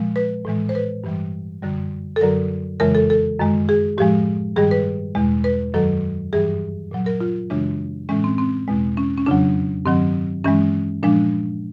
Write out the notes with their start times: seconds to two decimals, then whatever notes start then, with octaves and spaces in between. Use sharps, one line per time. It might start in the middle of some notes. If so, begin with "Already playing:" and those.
Already playing: A#2 F3 G#3
0.16 B4
0.45 A2 E3 G#3
0.69 C5
0.75 B4
1.04 G2 E3 G3
1.63 F#2 D3 G3
2.16 A4
2.21 F#2 D3 F#3 A#4
2.80 F2 C#3 E3 G#3 A#4
2.95 A4
3.10 A4
3.39 F#2 D#3 G#3
3.69 G#4
3.98 A2 F3 G#3 G4
4.56 G2 D#3 G3 G#4
4.71 B4
5.15 E2 B2 G#3
5.44 B4
5.74 F#2 D#3 F#3 A4
6.33 G2 E3 G3 G#4
6.91 A#2 F#3
7.06 A#4
7.21 F4
7.50 F#2 C#3 E3 G#3 D4
8.09 A2 E3 G#3 C#4
8.24 C4
8.38 C4
8.68 E2 B2 G#3
8.97 C#4
9.17 C#4
9.26 F2 C#3 F#3 D4
9.85 G2 D#3 F#3 C4
10.44 G2 E3 G#3 C#4
11.03 A#2 F3 G#3 D4